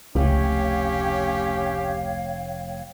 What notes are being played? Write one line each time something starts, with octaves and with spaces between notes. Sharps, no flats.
F1 C#2 A3 C#4 G4 C#5 F5 G5